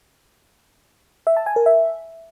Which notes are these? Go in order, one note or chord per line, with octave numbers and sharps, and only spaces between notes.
E5
A5
G#5
A#4
E5